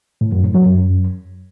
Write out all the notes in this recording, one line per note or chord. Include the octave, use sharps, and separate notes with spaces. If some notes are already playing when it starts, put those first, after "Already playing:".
A2
F#2
A2
F#3
F#2